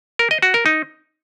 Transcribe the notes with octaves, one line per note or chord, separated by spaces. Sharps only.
A#4
D#5
F#4
A#4
D#4